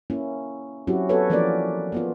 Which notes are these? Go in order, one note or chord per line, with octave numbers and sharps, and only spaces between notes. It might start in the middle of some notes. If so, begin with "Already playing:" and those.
A#3 C#4 E4
F#3 C4 C#4 E4 F#4 G4
B3 F#4 A4 B4 C#5
E3 F3 A#3 C#4 A#4 D5
A#3 B3 F4